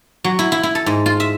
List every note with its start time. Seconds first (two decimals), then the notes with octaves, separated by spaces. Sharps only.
0.24 F#3
0.39 E4
0.52 E4
0.63 E4
0.75 A4
0.86 G#2
1.06 F4
1.20 E5